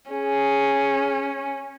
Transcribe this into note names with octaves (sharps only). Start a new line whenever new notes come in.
C#4 G#4